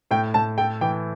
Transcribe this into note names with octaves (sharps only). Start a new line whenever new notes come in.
A2 G5
A2 A5
A4 G5
E3 G5